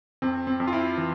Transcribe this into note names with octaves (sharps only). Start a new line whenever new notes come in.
F2 C4
C4
F2
F4
E4
E3